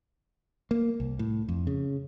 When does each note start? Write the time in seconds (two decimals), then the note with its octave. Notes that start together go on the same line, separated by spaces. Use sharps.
0.71 A#3
1.00 C2
1.19 A2
1.49 F2
1.67 C#3